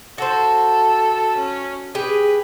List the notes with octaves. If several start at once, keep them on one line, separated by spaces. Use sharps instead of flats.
F#4 A4 C5
C#4
G4 G#4 B4